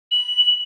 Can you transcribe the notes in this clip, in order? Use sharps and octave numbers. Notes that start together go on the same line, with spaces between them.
F#7